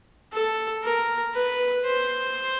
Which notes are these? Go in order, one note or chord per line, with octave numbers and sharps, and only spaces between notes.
A4
A#4
B4
C5